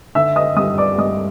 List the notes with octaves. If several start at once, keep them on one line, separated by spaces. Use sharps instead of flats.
D3 E5 E6
D#5 D#6
G2 D#5 D#6
D5 D6
G2 D#5 D#6